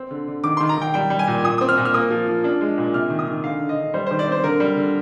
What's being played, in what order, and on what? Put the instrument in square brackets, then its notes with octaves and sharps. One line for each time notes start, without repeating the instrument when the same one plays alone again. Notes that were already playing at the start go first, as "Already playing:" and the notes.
Already playing: [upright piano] C4
D3
D3
D#3 D6
D#3 C6
A#5
D#3 G5
G3 G5
G3
G#5
A#2
A#2 D#6
C4 D#6
F6
A#2
F6
A#3 D#6
F3
F3
D4
G#3
A#2
C3 F6
D#3
D#6
D#3
D3 F5
D3
D#5
D3
G3 C5
D#3 C5
D5
C4 C5
D3 A#4
G3
D3